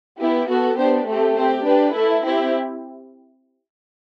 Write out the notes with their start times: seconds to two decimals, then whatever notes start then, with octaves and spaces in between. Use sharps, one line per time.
0.19 B3 E4 G4
0.48 B3 F#4 A4
0.77 B3 D4 G4 C5
1.06 A3 C4 G4
1.35 C4 G4 C5
1.64 D4 G4 B4
1.93 A3 E4 A4
2.23 C4 E4 G4